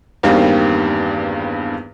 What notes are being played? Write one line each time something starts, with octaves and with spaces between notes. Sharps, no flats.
E2 G2 D#3 G3 A#3 C4